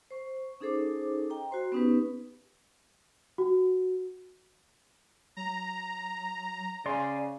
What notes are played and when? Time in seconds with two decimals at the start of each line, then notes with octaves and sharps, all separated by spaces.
0.11 C5 C#6
0.60 C#4 D#4 G#4 A4 C5 D6
1.30 D#5 G5 A#5
1.51 F#4 C5 C6
1.72 B3 C#4 D#4 G4 B4
3.38 F#4
5.37 F#3 A#5
6.86 C#3 D5 G#5 C6